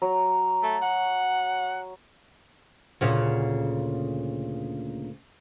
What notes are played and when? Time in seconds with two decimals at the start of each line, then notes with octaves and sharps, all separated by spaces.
0.02 F#3 A#5
0.63 A3
0.82 F#5
3.01 D2 A#2 C#3